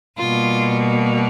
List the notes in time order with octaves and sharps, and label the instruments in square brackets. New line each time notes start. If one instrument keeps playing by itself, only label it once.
[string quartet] B2 G3 A#3 F4